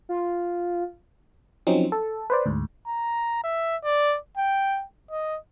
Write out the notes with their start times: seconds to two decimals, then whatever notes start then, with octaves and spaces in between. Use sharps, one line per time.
0.09 F4
1.67 F3 F#3 C4 C#4 D#4
1.92 A4
2.30 B4 C5 D5
2.46 D2 G#2
2.87 A#5
3.44 E5
3.84 D5
4.37 G5
5.11 D#5